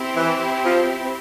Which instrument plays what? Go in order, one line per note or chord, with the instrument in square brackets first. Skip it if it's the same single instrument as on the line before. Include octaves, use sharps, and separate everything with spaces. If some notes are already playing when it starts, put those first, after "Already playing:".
Already playing: [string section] C4 E4 G4
[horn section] E3
F3